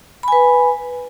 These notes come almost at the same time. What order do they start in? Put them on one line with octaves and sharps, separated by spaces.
B5 G#5 B4